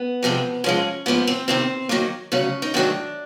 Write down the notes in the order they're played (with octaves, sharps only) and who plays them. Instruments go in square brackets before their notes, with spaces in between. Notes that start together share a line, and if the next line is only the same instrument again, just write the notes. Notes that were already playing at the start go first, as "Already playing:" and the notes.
Already playing: [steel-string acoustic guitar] B3
F2 C3 F3 G#3
G#2 F3 G#3 C#4
G#2 F3 A#3 B3
C4
E2 C3 D#3 C4
F#2 D#3 F#3 A#3
D2 C#3 F#3 C#4
D#4
G#2 D#3 F#3 A3 D4